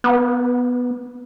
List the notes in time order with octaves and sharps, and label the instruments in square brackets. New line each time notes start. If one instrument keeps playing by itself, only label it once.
[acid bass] B3